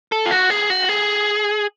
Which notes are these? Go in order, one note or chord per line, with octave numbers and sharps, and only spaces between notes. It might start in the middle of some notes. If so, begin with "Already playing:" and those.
A4
F4
F#4
G#4
F#4
G#4